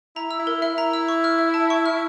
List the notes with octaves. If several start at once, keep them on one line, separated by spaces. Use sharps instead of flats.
E4 A#5
E6
E4
A#4
E4 E5
A#5
E6
C#6
F6
E5
A5
C#6
F6